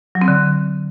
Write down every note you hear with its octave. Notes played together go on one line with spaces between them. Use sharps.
F#3
C4
D3